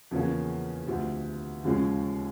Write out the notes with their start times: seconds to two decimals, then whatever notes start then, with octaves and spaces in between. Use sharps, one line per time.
0.11 E2 C#3 F3 A#3 C#4
0.87 D2 C3 F3
1.64 D#2 C#3 F3 G#3 C#4